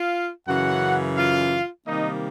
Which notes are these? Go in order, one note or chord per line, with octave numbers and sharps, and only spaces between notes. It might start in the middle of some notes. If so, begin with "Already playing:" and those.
Already playing: F4 F5
F#2 C#3 E3 F#4 F#5
F4 F5
C3 D#3 G3 A#3 D#4 D#5